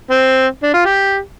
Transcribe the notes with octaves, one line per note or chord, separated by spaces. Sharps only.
C4
D4
F4
G4